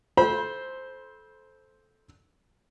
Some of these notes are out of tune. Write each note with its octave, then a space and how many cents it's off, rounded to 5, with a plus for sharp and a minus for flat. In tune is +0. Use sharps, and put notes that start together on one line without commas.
A4 -15 C5 +0 B5 -30